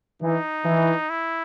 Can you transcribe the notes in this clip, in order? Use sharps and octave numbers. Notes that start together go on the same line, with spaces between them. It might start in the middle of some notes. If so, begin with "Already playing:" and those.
E3 D#4
E3
E4